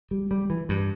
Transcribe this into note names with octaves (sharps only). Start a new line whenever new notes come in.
G3
G3
E3
G2